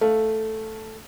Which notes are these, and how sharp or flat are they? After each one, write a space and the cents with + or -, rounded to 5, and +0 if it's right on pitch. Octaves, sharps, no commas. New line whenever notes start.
A3 +0 F5 +0